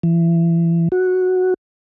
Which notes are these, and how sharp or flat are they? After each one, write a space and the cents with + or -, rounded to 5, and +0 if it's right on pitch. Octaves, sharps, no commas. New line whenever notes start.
E3 +30
F#4 -5